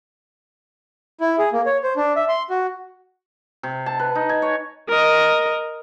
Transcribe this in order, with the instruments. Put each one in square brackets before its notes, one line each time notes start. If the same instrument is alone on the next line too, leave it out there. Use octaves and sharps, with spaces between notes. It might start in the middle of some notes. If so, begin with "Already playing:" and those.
[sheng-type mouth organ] E4
G#4
A#3
C#5
C5
D4
E5
C6
F#4
[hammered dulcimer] C3
A5
B4
D#4
G#5
C#5
[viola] A#4 D#5